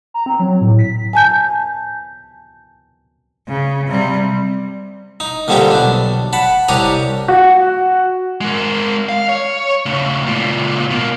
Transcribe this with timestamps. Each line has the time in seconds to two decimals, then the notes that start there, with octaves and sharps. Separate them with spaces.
0.14 A#5
0.26 C4
0.39 F#3
0.61 A2
0.79 B6
1.13 G#5 A5 G6
3.49 C#3
3.88 C3 G3
5.20 D#4
5.48 A#2 D3 G3 C4 D#4 G4
5.70 B1 D4
6.33 F#5 A5 B5
6.68 C2 D4 G4 C#5 A#5 D#6
7.28 F#4
8.41 G#3 A#4
9.09 F5
9.29 C#5
9.86 C#3 A3
10.26 C#2 A#2
10.91 B2 A#3